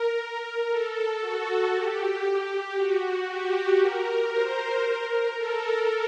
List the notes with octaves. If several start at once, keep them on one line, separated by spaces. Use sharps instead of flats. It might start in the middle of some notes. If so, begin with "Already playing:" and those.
Already playing: A#4
A#4
A4
F#4
G4
F#4
G4
A#4
C5
A#4
A4